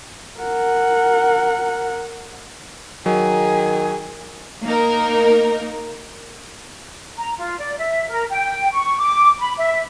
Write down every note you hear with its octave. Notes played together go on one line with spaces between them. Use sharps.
A#4 F#5
D#3 F#3 G#4
A#3 D#4 A#4
A#5
F4
D5
E5
A#4
G5
C#6
D6
B5
E5